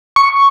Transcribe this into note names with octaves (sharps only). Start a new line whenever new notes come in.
C#6